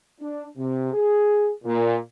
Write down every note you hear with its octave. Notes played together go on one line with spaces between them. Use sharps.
D4
C3
G#4
A#2